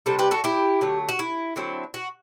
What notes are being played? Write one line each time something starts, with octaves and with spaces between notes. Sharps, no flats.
C3 G3 D4 A4 C5
G4 B4
F#4 A4
E4 G4
D3 F#3 A3
F#4
E4
D3 F#3 C4 E4
F#4